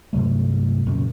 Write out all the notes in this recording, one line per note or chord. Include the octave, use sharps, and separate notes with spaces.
G2 C3 F#3 A3
F1 F#2 A#2 C#3